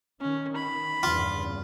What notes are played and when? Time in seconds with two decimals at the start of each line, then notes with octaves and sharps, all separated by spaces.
0.21 D#3 C#4
0.56 B5
1.03 E2 G2 C#3 F4